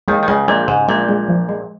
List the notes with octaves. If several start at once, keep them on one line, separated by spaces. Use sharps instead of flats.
D#2 D#3 G#3
D#3
C#2 C#3 G#3
A#1 A#2 G#3
G#2 C#3
A#1 A#2 G#3
G#3
F3
G#3